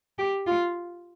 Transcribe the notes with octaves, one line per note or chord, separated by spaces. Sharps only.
G4
F4